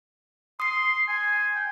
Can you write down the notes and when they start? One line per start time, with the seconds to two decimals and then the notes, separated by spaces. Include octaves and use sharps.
0.60 C6 D#6 C7
1.08 G#5
1.55 G5